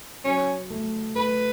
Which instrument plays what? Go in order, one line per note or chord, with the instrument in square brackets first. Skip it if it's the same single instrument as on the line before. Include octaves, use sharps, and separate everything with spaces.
[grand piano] F#3 [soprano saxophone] C#4
[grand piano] A3
[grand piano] A3 [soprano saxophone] B4